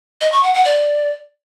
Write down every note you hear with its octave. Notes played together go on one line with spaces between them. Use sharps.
D#5
C#6
F#5
F#5
D5